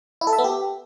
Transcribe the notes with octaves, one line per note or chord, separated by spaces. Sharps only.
E4
A4
E5
B3
G4